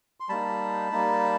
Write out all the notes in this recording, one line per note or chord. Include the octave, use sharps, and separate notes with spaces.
C6
G3 A#3 D#4 A5 B5
G3 A#3 D#4